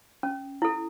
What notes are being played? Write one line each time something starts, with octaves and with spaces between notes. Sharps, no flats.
C#4
E4 A4